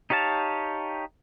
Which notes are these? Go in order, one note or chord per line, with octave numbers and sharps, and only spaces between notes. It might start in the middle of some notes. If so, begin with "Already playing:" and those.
D#4 G4 C#5 F5 A5